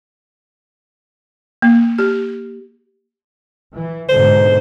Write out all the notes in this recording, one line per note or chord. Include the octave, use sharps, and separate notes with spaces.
A#3
G4
E3
G#2 B2 D3 C5